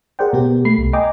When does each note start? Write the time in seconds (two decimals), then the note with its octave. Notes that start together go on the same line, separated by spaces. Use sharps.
0.19 G#4 A#4 C5 D5 F#5 G5
0.33 B2 B3 G4
0.65 A3 B5 C7
0.78 C2
0.93 D#5 G5 G#5 A#5 D6